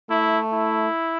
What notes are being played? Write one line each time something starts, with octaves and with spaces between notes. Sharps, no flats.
A3 E4
E4